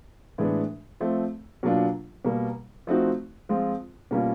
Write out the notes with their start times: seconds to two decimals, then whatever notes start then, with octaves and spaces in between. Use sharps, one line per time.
0.38 A2 E3 G#3 B3 D4
1.01 F3 A3 C4
1.63 B2 F#3 A#3 D4 F4
2.25 B2 G3 A#3
2.87 F3 A3 C4 D#4 F#4
3.49 F3 G#3 C4 F4
4.11 B2 G3 A#3 C#4 F4